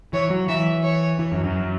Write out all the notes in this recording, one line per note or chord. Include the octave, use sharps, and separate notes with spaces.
E3 C#5
F#3
E3 E5
C#5
E3
F#2
F#2